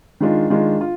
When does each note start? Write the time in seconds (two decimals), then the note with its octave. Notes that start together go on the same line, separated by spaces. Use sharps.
0.21 D#3 G#3 D4 F4
0.50 D#3 G#3 D4 F4
0.81 F4